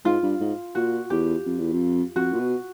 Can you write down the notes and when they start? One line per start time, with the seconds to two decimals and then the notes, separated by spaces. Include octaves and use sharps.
0.05 G#2 F4
0.23 G2
0.41 G#2
0.75 A#2 F#4
1.10 E2 G4
1.46 F2
1.59 E2
1.72 F2
2.16 F2 F#4
2.33 A#2
2.39 B2